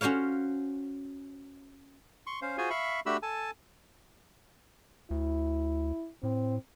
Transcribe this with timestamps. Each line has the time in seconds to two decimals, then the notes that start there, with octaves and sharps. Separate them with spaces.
0.01 C#4 F#4 C5 C#5 F5
2.27 C6 C#6
2.42 C#4 C5 F5
2.58 F4 F#4 G#4 C5 G#5
2.70 E5 F5 B5 C#6
3.06 A3 D4 F#4 G4 B5 E6
3.23 A4 G#5 A5
5.11 D2 E4
6.23 A2 C4